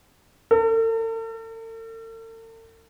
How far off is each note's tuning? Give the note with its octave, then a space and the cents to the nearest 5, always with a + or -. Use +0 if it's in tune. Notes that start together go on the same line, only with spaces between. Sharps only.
A4 +45